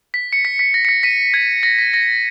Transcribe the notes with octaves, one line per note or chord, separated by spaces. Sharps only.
B6
C#7
B6
B6
A#6
C#7
B6
B6 D#7
G#6
A#6
B6
A#6